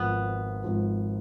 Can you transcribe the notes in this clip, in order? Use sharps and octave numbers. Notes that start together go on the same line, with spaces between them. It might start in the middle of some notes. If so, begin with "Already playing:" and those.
Already playing: G#1 G#2 F3 B3
G#1 G#2 F3